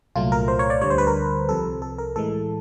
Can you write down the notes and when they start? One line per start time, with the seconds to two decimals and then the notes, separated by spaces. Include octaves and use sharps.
0.16 C2 A#2 F#3 A3 F4
0.32 A#4
0.48 C5
0.59 C#5
0.70 D5
0.82 D2 D3 G3 C#5
0.90 C5
0.98 B4
1.07 A#4
1.49 C2 C3 F3 A4
1.82 A4
1.98 A#4
2.16 A2 E3 G#3 A4